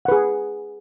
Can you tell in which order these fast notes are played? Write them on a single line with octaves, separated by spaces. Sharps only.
F#5 B4 G#4